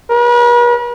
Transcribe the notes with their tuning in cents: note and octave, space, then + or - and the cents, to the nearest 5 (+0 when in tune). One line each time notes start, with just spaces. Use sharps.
B4 -45